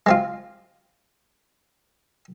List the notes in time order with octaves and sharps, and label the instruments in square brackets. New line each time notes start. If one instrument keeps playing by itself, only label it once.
[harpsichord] G#3 C4 F4